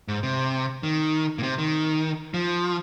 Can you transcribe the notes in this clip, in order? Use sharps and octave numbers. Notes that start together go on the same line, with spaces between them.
G#2
C3
D#3
A#2
C3
D#3
F3